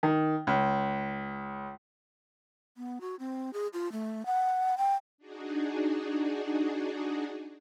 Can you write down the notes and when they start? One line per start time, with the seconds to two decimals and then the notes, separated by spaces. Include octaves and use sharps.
0.03 D#3
0.47 C#2
2.77 B3
3.01 F#4
3.19 C4
3.53 G#4
3.73 F4
3.92 A3
4.26 F#5
4.78 G5
5.18 D4 D#4 F#4 G#4